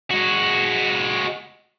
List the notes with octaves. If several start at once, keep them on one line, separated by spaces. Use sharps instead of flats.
G#3 F#4